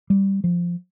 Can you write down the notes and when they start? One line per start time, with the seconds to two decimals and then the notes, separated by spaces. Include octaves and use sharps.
0.10 G3
0.44 F3